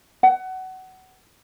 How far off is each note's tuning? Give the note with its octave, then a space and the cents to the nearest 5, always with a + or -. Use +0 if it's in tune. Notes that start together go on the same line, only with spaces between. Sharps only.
F#5 +20